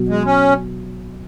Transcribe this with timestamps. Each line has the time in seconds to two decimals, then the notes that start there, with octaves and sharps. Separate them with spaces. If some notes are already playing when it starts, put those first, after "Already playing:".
Already playing: B2 F#3 B3 F#4
0.09 G#3
0.25 C#4